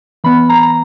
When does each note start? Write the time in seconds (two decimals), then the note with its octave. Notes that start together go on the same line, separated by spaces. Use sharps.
0.24 E3 B3 B5
0.49 A#5
0.63 A#5